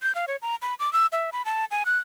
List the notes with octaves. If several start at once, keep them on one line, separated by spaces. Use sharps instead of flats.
G6
F5
C#5
A#5
B5
D6
E6
E5
B5
A5
G#5
F#6